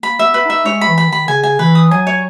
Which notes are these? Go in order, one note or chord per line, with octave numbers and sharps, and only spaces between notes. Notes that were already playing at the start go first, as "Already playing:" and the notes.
A#3 B5
B3 E5
B4
D#4 E5
G#3 C#5
B5
E3
B5
D#3 B5
C#3 G#5
G#5
E3 B4
D#6
F#3 G#5
C#5